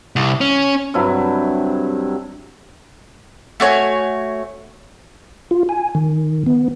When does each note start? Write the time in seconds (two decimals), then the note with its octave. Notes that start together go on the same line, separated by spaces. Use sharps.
0.16 C2
0.41 C#4
0.94 G2 C3 F#3 E4
3.60 A3 F#4 C#5 G#5
5.51 F4
5.69 G#5
5.95 D#3
6.46 B3